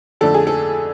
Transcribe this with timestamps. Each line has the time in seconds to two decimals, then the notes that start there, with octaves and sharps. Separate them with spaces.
0.21 F2 D3 A3 D4 A4
0.34 G#4
0.47 A4